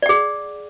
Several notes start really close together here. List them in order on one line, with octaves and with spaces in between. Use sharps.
D5 F#5 G#4